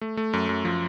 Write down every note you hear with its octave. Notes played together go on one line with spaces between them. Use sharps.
A3
A3
F#2
F#2
F3